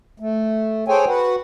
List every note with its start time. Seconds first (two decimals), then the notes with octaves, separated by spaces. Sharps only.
0.20 A3
0.88 G#4 A4 C5 C#5 G5 G#5
1.07 F#4 B4 F#5